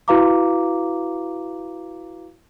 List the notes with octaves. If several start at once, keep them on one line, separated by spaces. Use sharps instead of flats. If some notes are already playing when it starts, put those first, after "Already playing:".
E4 F#4 B4 F5 A#5 D6